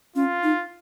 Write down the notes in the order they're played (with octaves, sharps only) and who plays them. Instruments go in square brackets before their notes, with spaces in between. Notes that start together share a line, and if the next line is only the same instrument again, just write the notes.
[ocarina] C#4 [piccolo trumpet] F4
[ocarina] D#4